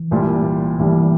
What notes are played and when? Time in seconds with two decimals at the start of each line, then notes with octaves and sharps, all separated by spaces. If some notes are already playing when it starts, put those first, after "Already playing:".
Already playing: E3
0.11 C2 A#2 G3
0.79 C2 A#2 E3 G3